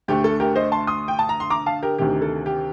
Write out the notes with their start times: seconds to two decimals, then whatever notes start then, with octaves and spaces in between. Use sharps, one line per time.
0.08 D2 D3 A3 G4
0.24 A4
0.40 G4 A#4
0.56 C5 D#5
0.72 A5 C6
0.87 C6 D#6
1.08 G5
1.19 A5
1.29 A#5
1.40 C6
1.50 A#5 D6
1.66 F5 A5
1.82 G4 A#4
1.98 D2 C3 D#3 G4
2.22 A4
2.46 G4